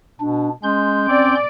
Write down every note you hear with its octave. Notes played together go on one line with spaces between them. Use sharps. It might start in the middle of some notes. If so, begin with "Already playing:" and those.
B2 D4
G#3 C#4 C6 G6
C4 D5